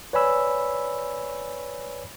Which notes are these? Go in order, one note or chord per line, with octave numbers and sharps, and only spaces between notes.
B4 C#5 D5 G#5 B5 E6